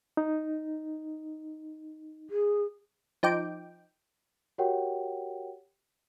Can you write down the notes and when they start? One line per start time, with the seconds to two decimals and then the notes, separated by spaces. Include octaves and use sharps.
0.17 D#4
2.30 G#4
3.23 F3 D#4 G5 D6
4.58 F#4 G4 A#4 C#5 F#5 G5